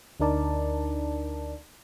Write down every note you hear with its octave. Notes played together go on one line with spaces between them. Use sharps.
D2 D4 D#4 A#4 D5 A5